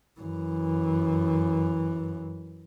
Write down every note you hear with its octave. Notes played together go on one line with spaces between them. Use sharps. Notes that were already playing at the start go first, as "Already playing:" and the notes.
F#2 E3